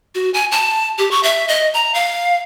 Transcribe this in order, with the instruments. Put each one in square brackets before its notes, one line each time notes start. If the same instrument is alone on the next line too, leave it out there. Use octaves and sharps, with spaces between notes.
[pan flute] F#4
G#5
A5
G4
C#6
E5
D#5
A#5
F5